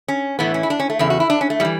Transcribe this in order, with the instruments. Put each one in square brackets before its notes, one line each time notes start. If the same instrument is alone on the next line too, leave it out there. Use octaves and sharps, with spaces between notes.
[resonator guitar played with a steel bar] C#4
A2 E3 B3
C#4
E4
D4
C#4
A3
E2 C#3 E4
F#4
E4
D4
C#4
A3
A2 G3
E3